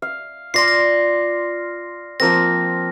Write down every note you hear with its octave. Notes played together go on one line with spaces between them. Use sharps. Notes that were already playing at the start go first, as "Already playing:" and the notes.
F5
F4 D5 C6 A#6 C7
A#6
F3 A#3 C4 A#6